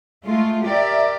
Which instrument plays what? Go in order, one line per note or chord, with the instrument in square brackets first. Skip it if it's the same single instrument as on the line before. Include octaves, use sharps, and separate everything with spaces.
[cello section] G#3 A3 F4
G4 A#4 D5 E5